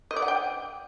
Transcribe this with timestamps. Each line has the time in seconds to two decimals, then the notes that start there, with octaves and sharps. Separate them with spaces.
0.11 D#5
0.16 D5
0.22 F#5
0.28 G5